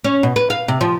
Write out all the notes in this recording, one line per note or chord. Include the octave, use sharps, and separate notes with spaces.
C#4
B2
B4
F5
C3
F3